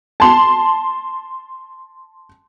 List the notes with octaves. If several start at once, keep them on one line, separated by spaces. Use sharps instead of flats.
A5 C6